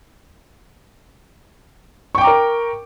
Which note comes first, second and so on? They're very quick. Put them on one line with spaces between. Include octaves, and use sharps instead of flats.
C#6 G5 D6 A#5 A#4